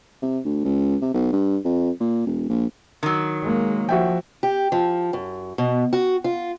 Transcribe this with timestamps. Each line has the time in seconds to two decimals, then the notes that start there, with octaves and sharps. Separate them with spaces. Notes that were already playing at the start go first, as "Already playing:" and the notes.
0.22 C3
0.45 D2
0.64 C#2
1.01 C3
1.14 B1
1.33 G2
1.64 F2
2.00 A#2
2.26 E1
2.49 A#1
3.03 D#3 F#3
3.42 G#3 A#3
3.89 F3 F#4 E5 G5
4.43 G4
4.72 F3
5.13 F#2
5.58 B2
5.93 F#4
6.24 F4